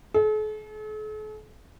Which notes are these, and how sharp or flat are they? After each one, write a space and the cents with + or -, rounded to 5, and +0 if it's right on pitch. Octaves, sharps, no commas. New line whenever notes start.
A4 -45